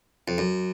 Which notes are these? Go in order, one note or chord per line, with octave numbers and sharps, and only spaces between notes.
F2
F#2